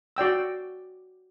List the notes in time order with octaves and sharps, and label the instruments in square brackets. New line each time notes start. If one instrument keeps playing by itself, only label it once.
[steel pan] F#4 D5 G5 E6